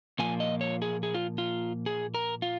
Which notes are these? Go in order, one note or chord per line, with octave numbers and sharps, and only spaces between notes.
A#2 F3 A#3 F4 G#5
D#5
C#5
G#4
G#4
F4
F4
G#4
A#4
F4